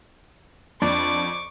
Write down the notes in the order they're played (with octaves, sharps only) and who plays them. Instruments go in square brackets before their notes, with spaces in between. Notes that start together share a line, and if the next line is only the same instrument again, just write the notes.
[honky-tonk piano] F2 [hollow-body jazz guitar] D4 [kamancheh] D5 [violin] C#6 D6